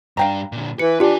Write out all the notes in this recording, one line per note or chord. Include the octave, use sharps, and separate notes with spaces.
G2 D4 F5 G5 A#5
A#2 D3
E3 B4 C#7
D4 F4 G4 B4 G#5